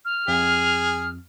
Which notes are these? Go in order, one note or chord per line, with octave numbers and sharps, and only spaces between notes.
F6
F2 G#4